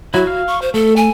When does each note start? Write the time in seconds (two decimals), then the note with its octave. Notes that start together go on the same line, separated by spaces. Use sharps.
0.14 F#3 E4 F#4
0.27 F5
0.47 C#6
0.62 C5
0.74 A3 A4
0.96 G#5